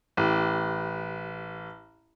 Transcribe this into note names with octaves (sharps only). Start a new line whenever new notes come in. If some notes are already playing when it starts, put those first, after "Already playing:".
A1 G4